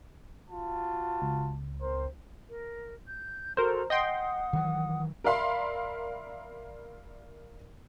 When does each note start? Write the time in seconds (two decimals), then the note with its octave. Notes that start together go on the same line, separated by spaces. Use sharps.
0.50 F4 F#4 A5
1.22 C#2
1.80 C4 A#4 C5
2.50 A#4
3.08 G6
3.57 F#4 A4 A#4 C5 A#5
3.90 D#5 F#5 G5 C6 D#6
4.53 D#3 E3 F#3
5.24 A#4 D5 E5 F5 B5 C6